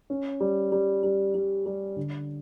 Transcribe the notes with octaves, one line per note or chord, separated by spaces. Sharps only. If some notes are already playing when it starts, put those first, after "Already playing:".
C#4
G3
G3
G3
G3
G3
D3